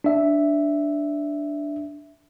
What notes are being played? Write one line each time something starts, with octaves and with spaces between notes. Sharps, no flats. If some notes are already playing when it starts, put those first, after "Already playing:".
D4 E5